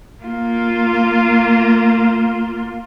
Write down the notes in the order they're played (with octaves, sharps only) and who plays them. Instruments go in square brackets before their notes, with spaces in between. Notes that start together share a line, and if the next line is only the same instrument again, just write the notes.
[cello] A#3 F4